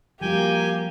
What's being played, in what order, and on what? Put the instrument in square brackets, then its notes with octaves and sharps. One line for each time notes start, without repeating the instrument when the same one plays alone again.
[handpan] F3 G3 F#4 [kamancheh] A#3 G4 [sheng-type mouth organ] G5 G#5